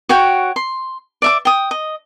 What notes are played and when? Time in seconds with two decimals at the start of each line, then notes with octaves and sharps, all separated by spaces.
0.09 F#4 C#5 F#5 G5
0.56 C6
1.22 D5 E5 D6
1.45 G5 D#6
1.71 D#5